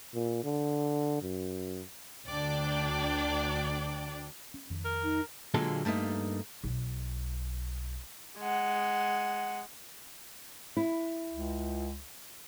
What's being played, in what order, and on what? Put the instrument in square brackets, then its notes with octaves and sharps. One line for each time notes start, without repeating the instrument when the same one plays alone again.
[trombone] A#2
D3
F#2
[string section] D2 D4 D5 G5
[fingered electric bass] C#4
F2 D#3 C#4
[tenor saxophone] A#4
[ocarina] D#4
[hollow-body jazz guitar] A#2 D3 F#3 G#3 A#3 A4
G2 A3 A#3 D#4
[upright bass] B1
[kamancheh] G#3 F#5
[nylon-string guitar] E4
[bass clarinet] C#2